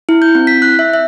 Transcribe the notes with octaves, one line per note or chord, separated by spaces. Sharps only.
E4
G6
C4
B6
F#6
E5
E5